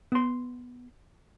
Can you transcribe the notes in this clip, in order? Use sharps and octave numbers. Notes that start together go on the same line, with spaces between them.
B3 C6